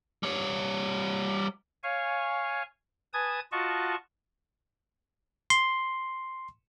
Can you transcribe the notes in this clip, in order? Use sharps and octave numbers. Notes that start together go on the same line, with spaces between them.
G3 C#5
C#5 F5 G#5 C#6
B4 G#5 A5 D#6 G#6
F4 F#4 D#5 F#5 A5 C#6
C6